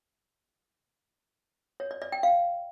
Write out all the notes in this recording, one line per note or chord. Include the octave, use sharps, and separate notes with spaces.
C#5
D5
D5
G5
F5